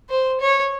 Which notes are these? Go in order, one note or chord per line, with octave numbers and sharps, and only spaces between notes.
C5
C#5